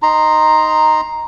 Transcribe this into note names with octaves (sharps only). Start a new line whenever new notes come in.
D#4 A#5 C6